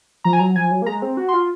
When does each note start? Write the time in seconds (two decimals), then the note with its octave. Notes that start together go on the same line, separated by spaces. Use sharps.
0.24 F3 A#5
0.33 G#5
0.39 F#3 A#5
0.56 F3 G#5
0.71 F#3
0.82 A#3
0.86 G#3 A#5
1.02 C4
1.17 F#4
1.29 C6
1.34 F4